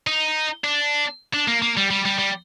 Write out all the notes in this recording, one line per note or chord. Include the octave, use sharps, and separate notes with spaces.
D#4
D4
D4
A#3
A#3
G3
G3
G3
G3